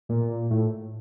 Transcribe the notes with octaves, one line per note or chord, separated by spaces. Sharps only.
A#2
A2